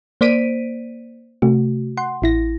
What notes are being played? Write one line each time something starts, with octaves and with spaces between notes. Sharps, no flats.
A#3 C5 D5 B6 D7 D#7
C3 A3 F#4
F#5 C6
A1 E4 A#6